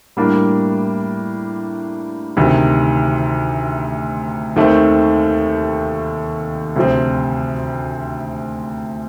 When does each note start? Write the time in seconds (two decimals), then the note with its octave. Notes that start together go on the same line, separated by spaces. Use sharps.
0.17 A2 G3 A#3 D4
2.37 D2 C3 D#3
4.56 D#2 D#3 A3 C4
6.76 D2 C3 F3 C4